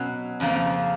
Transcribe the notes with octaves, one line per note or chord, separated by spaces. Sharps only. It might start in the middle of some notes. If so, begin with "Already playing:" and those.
Already playing: B2 F#3 C#4
F2 C#3 F3 A#3